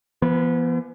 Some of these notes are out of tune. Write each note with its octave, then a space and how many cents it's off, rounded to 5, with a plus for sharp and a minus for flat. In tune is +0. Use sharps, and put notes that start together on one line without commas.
E3 +45 B3 -20